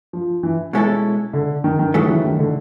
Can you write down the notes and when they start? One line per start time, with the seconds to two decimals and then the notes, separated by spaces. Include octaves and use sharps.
0.13 F3
0.43 E3
0.73 B2 G#3 C#4 E4 A4
1.33 D3
1.64 D#3
1.79 D#3
1.94 D#2 C#3 E3 F#3 A3
2.09 E3
2.24 D#3
2.39 D3